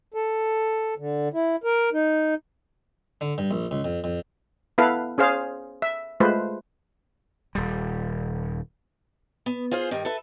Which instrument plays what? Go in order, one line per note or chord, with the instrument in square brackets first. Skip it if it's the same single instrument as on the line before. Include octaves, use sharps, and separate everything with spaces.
[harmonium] A4
D3
E4
A#4
D#4
[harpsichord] D3
G2
A#1
C#2
F2
F2
[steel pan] B3 E4 A4 B4 F5
C#4 G#4 C5 F5
E5
G#3 A3 F4 B4 C5
[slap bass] D#1 G3
[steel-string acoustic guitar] B3
F4 G#4 C5 F5
G2 D#3
A4 B4 E5